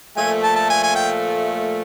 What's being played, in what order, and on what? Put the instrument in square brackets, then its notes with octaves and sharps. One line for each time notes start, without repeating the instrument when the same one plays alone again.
[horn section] A#2 F3 A3 [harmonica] G#5
[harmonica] A5
A5
G#5
G#5
G5